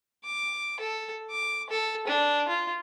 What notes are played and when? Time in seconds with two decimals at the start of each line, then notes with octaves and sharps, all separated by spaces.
0.25 D6
0.80 A4
1.30 D6
1.70 A4
2.08 D4
2.48 F4